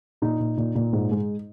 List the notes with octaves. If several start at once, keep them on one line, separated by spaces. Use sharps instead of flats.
A#2 D#4
A#2
A#2
A#2
G#2
G#3